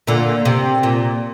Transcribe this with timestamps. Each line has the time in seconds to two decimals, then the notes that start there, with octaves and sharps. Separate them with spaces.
0.07 A#2 D3
0.45 C3
0.83 A#2